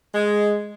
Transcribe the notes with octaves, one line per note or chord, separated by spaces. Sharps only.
G#3